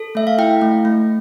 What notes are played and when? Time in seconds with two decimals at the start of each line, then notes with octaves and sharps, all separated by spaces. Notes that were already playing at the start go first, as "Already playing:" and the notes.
Already playing: A4
0.15 A3 E5
0.27 F5
0.38 E4 G5
0.62 A3
0.85 A3